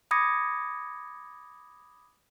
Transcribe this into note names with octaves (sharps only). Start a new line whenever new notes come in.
B5 D6 D#6 G#6 A#6 C#7